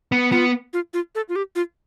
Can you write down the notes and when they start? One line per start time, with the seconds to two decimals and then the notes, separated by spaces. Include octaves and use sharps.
0.12 B3
0.32 B3 F4
0.73 F4
0.94 F4
1.15 A4
1.29 F4
1.36 G4
1.56 F4